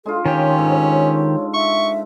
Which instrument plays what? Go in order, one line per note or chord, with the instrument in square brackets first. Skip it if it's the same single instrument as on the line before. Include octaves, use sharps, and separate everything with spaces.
[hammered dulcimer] G#3 D4 F4 [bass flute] A4
[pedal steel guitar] D#3 G4 [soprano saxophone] C#4 [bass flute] C#5
[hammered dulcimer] G#2 A4
[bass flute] E5 [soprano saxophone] C#6